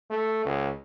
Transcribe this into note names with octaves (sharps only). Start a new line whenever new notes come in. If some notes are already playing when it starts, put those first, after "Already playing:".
A3
C#2